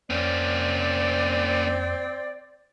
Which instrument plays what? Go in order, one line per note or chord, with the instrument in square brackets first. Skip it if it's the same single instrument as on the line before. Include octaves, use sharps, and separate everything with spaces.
[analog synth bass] F2 [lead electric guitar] A#3 C#4 [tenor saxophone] C4 [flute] D5